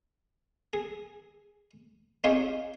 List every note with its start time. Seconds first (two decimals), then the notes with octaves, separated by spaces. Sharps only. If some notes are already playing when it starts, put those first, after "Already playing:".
0.73 G#4
2.24 C4 D#4 F4 G4 G#4 C#5